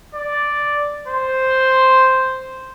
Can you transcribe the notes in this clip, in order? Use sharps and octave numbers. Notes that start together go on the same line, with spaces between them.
D5
C5